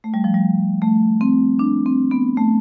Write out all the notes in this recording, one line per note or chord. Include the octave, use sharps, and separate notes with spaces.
A3
G3
F3
G3
A3
C4
D4
C4
B3
A3